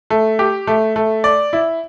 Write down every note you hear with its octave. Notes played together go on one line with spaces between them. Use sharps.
A3
G4
A3
A3
D5
E4